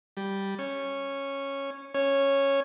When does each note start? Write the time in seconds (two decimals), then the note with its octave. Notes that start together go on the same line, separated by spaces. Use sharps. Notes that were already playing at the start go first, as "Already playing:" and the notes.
0.17 G3
0.59 C#4 C#6
1.94 C#4 C#5